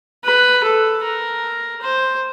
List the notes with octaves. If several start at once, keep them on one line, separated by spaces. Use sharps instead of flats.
B4
A4
A#4
C5